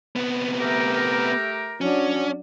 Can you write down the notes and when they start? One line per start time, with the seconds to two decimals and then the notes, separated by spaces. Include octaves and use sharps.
0.16 C3 B3
0.59 A3 G4 A#4
1.81 F#3 C#4 D4